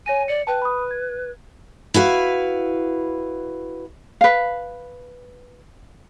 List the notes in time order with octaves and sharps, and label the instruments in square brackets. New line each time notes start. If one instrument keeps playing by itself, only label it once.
[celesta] C#5 A#6 D#7 [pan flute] G#5
[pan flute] D5 [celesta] C#7
[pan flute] B4 [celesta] G5 A5
[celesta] B5 D#6
G#6
[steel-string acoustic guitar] E4 F#4 B4 F5
[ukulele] B4 F5